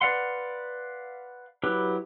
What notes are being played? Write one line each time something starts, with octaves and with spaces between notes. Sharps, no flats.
B4 D5 F5 F#5 C6
F#3 E4 G4 B4